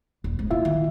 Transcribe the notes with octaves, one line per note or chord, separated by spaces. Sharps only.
D#1
G#2
A#2 E4 F4 E5
D#3